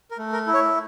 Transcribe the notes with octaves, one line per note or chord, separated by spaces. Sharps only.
A#4
A3
A#4
E4
C#5